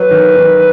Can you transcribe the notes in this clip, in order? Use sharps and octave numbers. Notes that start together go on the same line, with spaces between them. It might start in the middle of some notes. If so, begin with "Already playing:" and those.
Already playing: F#3 B4
D#3
D#3